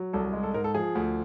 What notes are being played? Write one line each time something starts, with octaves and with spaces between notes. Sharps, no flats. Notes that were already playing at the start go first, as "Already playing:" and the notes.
Already playing: F#3
C2 A4
G#3
A4
G#2 A#4
A4
F3 G#4
D2